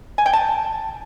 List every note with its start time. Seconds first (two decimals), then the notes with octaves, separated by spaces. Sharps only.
0.18 G#5
0.26 G5
0.33 A5